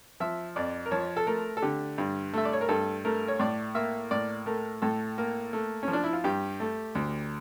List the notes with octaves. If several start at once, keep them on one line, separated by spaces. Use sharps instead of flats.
F3 E5
F2 D5
A#4
F3 C#5
A4
A3 A#4
A4
D3 G4
G2
A3 E5
D5
C#5
A#4
G2 A4
A3 A#4
C#5
A2 D5
A#3 E5
A2 D5
A3 A#4
A2 A4
A#3
A3
C#4
F3
D4
E4
F4
G2 G4
A3
D2